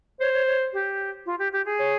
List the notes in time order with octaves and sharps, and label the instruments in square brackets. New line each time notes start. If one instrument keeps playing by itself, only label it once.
[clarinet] C5 [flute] C#5
[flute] C#5
C#5
G4
F4
G4
G4
G#4
[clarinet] C#5